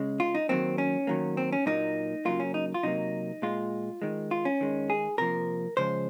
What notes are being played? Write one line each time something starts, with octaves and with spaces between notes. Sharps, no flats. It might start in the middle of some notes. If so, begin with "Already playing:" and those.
Already playing: C#3 G#3
F4
D#4
D#3 F#3 A#3 C4
C#4
D#3 F#3 A#3
C4
C#4
A#2 F#3 A#3 D#4
C#3 F#3 A#3 F4
C#4
D#4
F4
C3 F#3 A#3 D#4
A#2 G#3 F4
D#3 G#3
F4
C#4
D#3 G#3
G#4
C3 F3 A#3 A#4
C#3 F3 G#3 C5